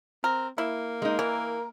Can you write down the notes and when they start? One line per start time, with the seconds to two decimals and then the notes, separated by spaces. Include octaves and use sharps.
0.24 C4 A#4
0.58 A#3 E4
1.02 G#3 D#4
1.19 E3 A#4